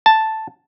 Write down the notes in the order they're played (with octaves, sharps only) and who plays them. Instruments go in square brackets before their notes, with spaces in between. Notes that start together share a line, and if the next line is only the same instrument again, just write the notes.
[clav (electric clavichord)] A5